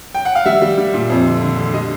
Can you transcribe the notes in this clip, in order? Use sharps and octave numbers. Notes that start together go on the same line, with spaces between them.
G5
F#5
F5
G3 E5
G3
G3
A#2
F2
D3
D3
D3
G3 D#5